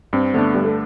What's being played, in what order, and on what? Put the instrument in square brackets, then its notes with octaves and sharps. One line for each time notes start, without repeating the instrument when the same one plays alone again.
[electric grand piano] G2 [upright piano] C4
[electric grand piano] D3 A3 D4 [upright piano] B3
[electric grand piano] G2 [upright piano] G3
[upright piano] A3